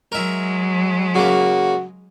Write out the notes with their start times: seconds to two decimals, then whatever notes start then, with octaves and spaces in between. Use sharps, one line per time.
0.12 F#3 G#3 A#4 E5
1.15 C#3 A#3 F#4